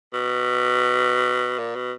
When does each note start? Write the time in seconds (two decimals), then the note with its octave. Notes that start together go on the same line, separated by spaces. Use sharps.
0.13 B2
1.59 A#2
1.75 B2